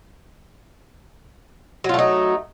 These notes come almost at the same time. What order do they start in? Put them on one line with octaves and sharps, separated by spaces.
F#3 F4 A3 D#4